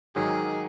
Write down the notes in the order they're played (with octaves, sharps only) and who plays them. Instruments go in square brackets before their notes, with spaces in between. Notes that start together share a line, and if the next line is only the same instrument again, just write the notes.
[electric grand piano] G#2 D#3 F#3 [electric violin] G#4